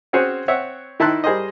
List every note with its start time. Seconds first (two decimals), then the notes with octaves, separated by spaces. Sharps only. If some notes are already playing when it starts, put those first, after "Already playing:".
0.13 C4 C#4 F#4 G#4 C5 C#5
0.48 C4 C#5 E5 F#5
1.00 D#3 E4 A5 C6 F#6
1.24 G3 G#4 A#4 C5 D#5